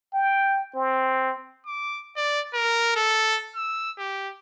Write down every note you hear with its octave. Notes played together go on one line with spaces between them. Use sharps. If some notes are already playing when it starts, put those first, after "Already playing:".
G5
C4
D6
D5
A#4
A4
E6
G4